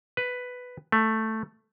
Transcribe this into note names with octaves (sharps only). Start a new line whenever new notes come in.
B4
A3